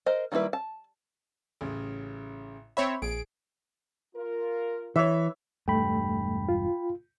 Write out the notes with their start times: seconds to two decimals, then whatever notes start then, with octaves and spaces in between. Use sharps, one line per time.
0.06 A#4 C5 D#5
0.32 D#3 G3 A#3 E4 B4
0.53 A5
1.61 A1 C#3
2.77 C4 C#5 E5 B5
3.02 A#1 G#4 D7
4.15 F4 A#4
4.96 E3 C#5 E5
5.68 E1 G2 G3 A3 G5 B5
6.49 F4